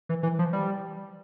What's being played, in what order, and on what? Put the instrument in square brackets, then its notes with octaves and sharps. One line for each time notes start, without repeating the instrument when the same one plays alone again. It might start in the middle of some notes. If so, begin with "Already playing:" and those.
[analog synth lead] E3
E3
F3
G3